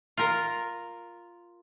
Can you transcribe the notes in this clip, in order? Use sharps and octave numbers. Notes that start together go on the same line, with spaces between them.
F4 A#4